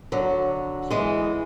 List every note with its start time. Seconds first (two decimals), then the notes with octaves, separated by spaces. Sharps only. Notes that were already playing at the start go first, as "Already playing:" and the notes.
0.12 D3 F#3
0.90 E3 G#3